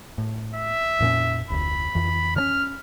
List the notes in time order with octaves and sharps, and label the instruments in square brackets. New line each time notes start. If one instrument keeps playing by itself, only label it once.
[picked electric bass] A2
[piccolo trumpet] E5
[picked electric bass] F2 A#2 C#4
[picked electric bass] F1 D2 [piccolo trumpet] B5
[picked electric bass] F2 E3
[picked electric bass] D3 C#4 [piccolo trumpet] F6